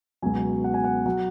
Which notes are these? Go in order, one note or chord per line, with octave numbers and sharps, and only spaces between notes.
C#2 B2 F#3 G#5
F#5
G#5
F#5
F#3 F#5